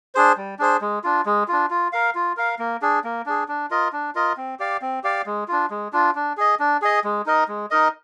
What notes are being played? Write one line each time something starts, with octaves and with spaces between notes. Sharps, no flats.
D4 G#4 C5
G3
D4 G#4 C5
G#3
D4 F4
G#3
D4 F4
F4
A#4 F5
F4
A#4 F5
A#3
D4 G#4
A#3
D4 G#4
D4
F4 A#4 D#5
D4
F4 A#4 D#5
C4
G4 D5 F5
C4
G4 D5 F5
G#3
D4 F4
G#3
D4 F4
D4
G#4 D#5
D4
G#4 D#5
G#3
D#4 A#4 D#5
G#3
D#4 A#4 D#5